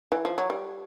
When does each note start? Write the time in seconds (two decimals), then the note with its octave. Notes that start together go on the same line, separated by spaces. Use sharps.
0.12 E3
0.25 F3
0.38 F#3
0.50 G3